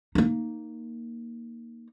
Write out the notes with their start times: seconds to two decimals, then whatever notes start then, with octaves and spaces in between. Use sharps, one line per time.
0.15 A#3 D#4